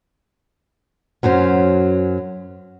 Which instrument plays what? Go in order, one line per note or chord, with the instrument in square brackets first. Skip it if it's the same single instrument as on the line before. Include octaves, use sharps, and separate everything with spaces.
[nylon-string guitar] F#2 F#3 C#4 C5